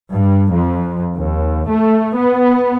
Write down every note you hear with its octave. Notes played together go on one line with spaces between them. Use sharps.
G2
F2
D#2
A3
B3